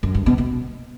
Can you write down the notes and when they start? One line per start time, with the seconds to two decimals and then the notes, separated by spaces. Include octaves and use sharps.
0.03 F#2
0.15 G2
0.26 B2
0.38 B2